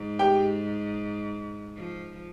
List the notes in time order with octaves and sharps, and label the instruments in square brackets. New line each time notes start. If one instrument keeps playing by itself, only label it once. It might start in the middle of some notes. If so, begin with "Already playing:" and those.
Already playing: [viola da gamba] G#2
[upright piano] G4 G5
[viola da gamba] F3